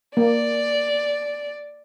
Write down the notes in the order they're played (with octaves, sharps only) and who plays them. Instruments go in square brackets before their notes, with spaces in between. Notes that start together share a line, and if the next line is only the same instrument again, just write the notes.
[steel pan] A#3 [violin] D5